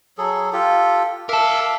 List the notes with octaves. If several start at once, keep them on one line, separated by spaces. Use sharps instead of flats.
F#3 G#4 A4
F4 G4 A4
A#4 E5 F5 A5 D6